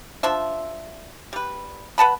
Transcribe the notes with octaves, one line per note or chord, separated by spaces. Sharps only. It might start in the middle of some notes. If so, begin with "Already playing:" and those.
F3 D4 C5 E5
G3 B4
B4 F#5 A5 B5